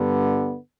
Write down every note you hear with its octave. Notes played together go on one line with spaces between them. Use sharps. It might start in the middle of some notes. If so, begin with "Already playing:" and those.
Already playing: G2 D3 G3 B3